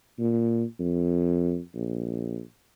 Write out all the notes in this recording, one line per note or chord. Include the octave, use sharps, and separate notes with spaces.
A#2
F2
A#1